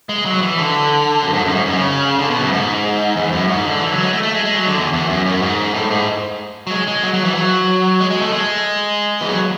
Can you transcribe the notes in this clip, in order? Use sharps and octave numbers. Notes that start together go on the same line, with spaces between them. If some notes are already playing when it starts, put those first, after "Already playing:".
G#3
F#3
E3
D3
F#2
G#2
F#2
G#2
F#2
C#3
D3
B2
F#2
G#2
E2
F#2
G#2
D3
E3
F#3
G#3
A3
A3
G#3
G#3
F#3
D3
E2
E2
F#2
F#2
G#2
A2
G#2
F#3
G#3
G#3
F#3
F#3
E3
F#3
G#3
G#3
A3
G#3
E3
F#3